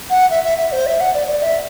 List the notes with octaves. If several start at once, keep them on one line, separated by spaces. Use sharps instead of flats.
F#5
E5
E5
E5
C5
E5
F#5
D5
D5
E5